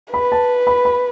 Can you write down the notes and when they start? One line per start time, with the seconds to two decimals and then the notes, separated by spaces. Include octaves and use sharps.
0.13 B4 B5
0.32 A5
0.67 B5
0.85 B5